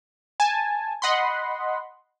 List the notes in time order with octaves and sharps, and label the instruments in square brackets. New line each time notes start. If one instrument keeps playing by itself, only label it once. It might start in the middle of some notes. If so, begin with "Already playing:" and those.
[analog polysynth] G#5 A5
D#5 F#5 B5 C6